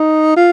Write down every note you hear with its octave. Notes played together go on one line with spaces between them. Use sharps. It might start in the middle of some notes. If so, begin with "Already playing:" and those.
Already playing: D#4
F4